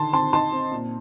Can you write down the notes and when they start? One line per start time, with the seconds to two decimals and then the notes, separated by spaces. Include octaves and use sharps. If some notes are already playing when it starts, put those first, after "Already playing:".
Already playing: D3 D#3 A5 C6
0.12 C4 A5 C6
0.33 D#4 A5 C6
0.52 C4
0.71 A#2